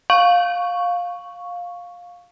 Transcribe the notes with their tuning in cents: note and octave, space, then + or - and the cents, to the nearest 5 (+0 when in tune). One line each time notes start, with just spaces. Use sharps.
F5 +15 C#6 +0